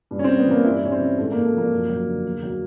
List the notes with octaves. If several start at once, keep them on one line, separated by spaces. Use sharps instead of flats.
G2
C#4
G2 C4
B3
E3 A#3
G2 E4
G2 C#4
C4
E3
G#2 A3
G#2 A#3
A3
F3 A#3
F#2
F#3
D3
E2
F#3